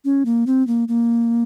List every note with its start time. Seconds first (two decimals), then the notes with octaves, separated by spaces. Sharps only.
0.05 C#4
0.25 A#3
0.47 C4
0.67 A#3
0.88 A#3